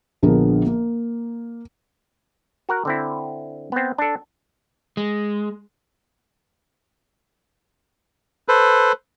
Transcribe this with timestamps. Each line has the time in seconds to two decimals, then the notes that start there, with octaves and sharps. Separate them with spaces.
0.23 A#1 D3 F3 B3 G#4 A#4
0.66 A#3
2.69 F#4 A#4 F#5
2.85 D3 C4 E4
3.72 B3 C4
3.98 D4 A4
4.97 G#3
8.48 A4 B4 C5